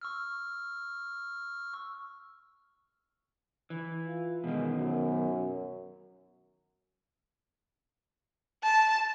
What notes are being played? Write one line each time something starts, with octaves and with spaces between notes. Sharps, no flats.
C#6 E6 F6
E3
F4
B2 D#3 G#3
F#2
A5